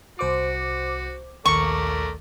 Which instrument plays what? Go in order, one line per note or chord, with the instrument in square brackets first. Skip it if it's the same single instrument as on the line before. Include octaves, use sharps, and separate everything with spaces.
[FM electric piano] C2 C5 D6 [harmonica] F#4
[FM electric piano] A#1 D#2 [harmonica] A3 A#4 D5 [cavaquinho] C#6